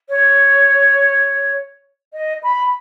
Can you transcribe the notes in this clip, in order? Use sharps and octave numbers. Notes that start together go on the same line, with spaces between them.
C#5
D#5
B5